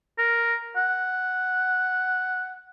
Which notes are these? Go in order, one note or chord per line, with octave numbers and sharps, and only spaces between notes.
A#4
F#5